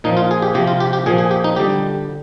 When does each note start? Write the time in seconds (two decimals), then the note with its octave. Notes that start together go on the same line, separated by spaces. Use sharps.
0.04 A#2 F3 D#4
0.17 F4
0.31 G#4
0.42 G4
0.54 C3 F3 G4
0.67 F4
0.80 G4
0.93 G4
1.06 A#2 F3 G#4
1.18 G#4
1.31 G4
1.44 D#4
1.56 D3 G3 G4